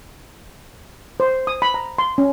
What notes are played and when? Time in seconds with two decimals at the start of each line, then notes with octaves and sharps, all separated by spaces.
1.20 C5
1.47 D#6
1.62 B5
1.74 A#5
1.98 C6
2.18 C#4